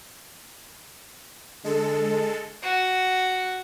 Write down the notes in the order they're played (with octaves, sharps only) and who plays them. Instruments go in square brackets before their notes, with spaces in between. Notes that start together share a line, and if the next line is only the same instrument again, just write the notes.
[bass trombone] D3 [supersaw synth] G#3 A4
[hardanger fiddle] F#4